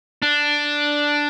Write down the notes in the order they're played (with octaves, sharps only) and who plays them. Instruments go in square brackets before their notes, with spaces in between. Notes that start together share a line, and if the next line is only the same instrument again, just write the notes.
[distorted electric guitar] D4